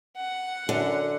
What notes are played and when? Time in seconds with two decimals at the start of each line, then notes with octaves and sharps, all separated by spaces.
0.17 F#5
0.69 F#2 D3